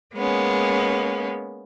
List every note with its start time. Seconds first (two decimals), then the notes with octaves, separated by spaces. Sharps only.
0.15 G#3 A#3 B3 C#4